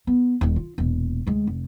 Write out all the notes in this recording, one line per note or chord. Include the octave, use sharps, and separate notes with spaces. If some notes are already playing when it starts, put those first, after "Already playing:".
B3
D#1 D#2
F4
E1 A#2
D2 G#3
F1